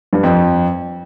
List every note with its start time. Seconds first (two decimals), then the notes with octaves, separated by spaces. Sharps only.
0.13 G2
0.23 F2